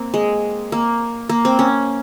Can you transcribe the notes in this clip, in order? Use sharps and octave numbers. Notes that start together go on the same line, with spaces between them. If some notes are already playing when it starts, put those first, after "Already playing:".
Already playing: A#3 C4
G#3
A#3
A#3
C4
C#4